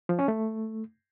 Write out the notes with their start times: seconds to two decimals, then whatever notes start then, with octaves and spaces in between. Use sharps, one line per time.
0.09 F3
0.19 C#4
0.28 A3